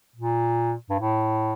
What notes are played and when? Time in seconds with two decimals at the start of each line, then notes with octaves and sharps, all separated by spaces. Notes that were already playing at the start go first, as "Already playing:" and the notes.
0.16 A#2
0.90 G2
0.99 A2